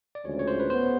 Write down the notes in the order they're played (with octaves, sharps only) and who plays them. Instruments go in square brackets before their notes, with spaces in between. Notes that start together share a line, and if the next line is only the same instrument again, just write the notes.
[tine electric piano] D5
[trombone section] D2 C#3 F3 G#3 C#4 [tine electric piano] C#5
[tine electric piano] C#5
C5
B4
[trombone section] B3 [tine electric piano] C5